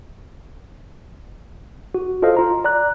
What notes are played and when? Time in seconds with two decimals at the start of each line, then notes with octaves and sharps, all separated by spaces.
1.95 F#4
2.22 F4 A4 C5 D#5 F5
2.37 F4 A#5
2.64 D5 A#5 F#6